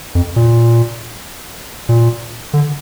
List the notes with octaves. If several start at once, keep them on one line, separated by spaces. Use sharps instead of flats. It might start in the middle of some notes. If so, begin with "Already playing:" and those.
F2
A#2
A#2
D3